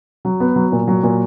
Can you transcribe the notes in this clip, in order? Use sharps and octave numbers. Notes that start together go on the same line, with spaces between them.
F#3
B3
F#3
A#2
F#3
A#2